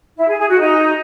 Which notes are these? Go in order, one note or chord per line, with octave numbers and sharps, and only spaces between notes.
E4
G#4
G#4
F#4
D#4